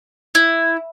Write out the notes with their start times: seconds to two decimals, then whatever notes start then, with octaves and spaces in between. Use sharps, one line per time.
0.35 E4